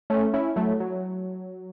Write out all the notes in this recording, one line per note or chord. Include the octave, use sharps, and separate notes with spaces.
A3 C#4
C#4 E4
F#3 A3
F#3